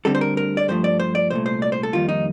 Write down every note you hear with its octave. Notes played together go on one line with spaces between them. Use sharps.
D2 D3 G3 C4 A4
C5
A#4
A#4
D5
G2 F3 A3 C5
D5
C5
D5
C2 A#2 A3 C5
C5
D5
C5
A4
F2 D#3 G3 A#3 F4
D#4